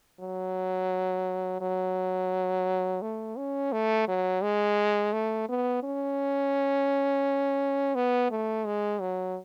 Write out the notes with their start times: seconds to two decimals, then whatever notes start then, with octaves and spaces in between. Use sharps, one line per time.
0.20 F#3
1.61 F#3
3.02 A3
3.38 C#4
3.72 A3
4.08 F#3
4.43 G#3
5.13 A3
5.49 B3
5.83 C#4
7.95 B3
8.31 A3
8.65 G#3
9.01 F#3